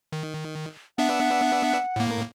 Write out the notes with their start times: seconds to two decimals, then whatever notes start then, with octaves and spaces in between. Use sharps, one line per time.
0.12 D#3
0.98 B3 D4 E5 F#5
1.96 A2 A#3